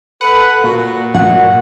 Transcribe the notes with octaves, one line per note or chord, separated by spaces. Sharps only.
A4 B4 F#5
A#2 F#4
D4 F#4 F#5